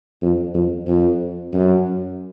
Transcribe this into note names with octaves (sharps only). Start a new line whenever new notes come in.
F2
F2
F2
F#2